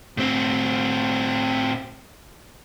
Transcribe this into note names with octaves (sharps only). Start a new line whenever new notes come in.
A2 C4